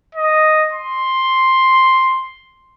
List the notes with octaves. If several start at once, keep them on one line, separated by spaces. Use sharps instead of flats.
D#5
C6